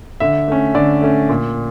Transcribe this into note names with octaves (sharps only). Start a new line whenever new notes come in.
D3 E5
A3 C#4
D3 D5
A3 C#4
A#2